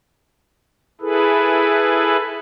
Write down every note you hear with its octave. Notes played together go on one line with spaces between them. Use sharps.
E4 G#4 A4 B4